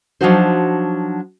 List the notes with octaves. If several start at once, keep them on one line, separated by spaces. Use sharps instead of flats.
F3 F#3 D4 D#4 F#4 C5